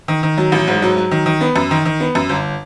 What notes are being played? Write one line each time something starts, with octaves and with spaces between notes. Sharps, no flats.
D#3
D#3
F#3
A1
G#2
F#3
F#3
D#3
D#3
B3
F#2
D#3
D#3
B3
F#2
G1